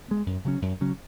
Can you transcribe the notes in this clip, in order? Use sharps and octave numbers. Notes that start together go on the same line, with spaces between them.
G#3 B3
F#2
C#3 F#3 C#4
F#2
C#3 F#3 C#4